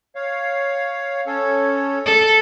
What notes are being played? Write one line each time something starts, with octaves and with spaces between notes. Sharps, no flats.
C#5 F5
C#4 A4 C#5
A4